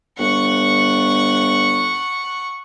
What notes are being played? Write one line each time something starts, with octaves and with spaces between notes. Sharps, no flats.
G1 F#5 C#6